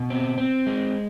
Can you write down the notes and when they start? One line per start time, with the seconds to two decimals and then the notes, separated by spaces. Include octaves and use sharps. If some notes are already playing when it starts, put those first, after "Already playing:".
Already playing: B2
0.10 C4
0.38 C4
0.67 G#3